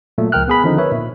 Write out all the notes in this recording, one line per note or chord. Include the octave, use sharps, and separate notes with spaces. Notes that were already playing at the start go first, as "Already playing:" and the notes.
A#2 F#3 A3
C#2 F3 A#4 G5 F6 F#6
B3 G#4 B5
D3 D#3 F3 C4 D#4
A#4 B4 C#5 E5
A#2